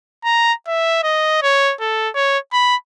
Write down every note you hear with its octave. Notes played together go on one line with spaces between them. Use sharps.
A#5
E5
D#5
C#5
A4
C#5
B5